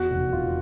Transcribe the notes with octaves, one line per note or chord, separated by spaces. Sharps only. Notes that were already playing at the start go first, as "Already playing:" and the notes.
Already playing: E2 F#4
F1
F1 F4